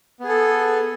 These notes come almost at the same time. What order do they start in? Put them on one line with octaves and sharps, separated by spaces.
B3 G#4 A4